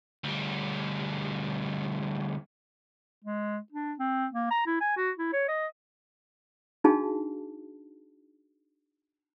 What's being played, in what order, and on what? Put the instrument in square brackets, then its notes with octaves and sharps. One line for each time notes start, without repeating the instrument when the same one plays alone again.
[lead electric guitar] D2 G3
[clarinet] G#3
D4
C4
A#3
A#5
E4
G#5
F#4
E4
C#5
D#5
[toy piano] D4 D#4 F#4 G#4 F5 A5